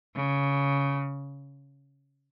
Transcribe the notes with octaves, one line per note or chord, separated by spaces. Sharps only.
C#3